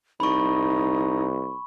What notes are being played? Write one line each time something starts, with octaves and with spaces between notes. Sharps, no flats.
C2 D#4 B5 C#6